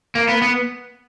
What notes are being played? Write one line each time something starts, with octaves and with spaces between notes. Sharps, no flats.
A#3
B3
B3